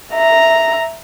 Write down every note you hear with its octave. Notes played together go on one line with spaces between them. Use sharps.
E5 A#5